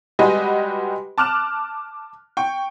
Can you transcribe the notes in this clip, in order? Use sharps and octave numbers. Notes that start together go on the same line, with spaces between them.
G3 G#3 F#4 G4 B4 D#5
A5 D6 F6 F#6 E7
G5 C#6